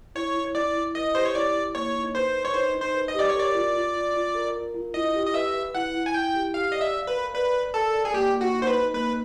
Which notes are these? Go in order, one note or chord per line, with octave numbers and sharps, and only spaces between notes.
E4 C#5
E4
E4 D5
E4
B4 D#5
G4 C5
C#5
E4 D5
E4
A#3 C#5
D#4
B4 C5
B4
C#5
D#4 C5
D#4
C5
B4
D#5
G4 D5
C#5
A#4 D5
F4
F4
F4
F4
A#4
A#4
F4
E4 D#5
G4
D#5
B4 E5
B4
E4 F#5
E4
G#5
E4 G5
G4
G4 F5
D5 D#5
E5
F5
B4
A#4
B4 D5
D5
A4 A#4
D5
G#4
A#3 G4
A#3
F#4
D#4
C5
B4
D#4
A#3 B4